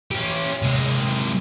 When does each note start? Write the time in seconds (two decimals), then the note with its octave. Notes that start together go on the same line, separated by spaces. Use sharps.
0.11 C#4 G4
0.63 C3 G#3